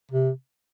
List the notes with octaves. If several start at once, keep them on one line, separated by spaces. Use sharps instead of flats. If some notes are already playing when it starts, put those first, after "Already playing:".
C3